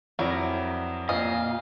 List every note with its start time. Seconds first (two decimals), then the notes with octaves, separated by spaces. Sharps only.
0.19 F2 F#3 E4 A#4 D5
1.09 A#2 D#5 F5